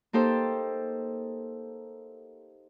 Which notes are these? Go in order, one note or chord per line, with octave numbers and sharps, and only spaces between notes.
A#3 D#4 G4 A4 C5